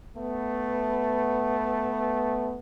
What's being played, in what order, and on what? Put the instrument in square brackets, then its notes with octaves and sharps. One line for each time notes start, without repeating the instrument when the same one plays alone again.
[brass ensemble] A3 B3